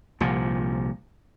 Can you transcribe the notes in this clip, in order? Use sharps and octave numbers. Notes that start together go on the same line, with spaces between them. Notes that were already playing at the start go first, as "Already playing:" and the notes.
C2 A#2 F3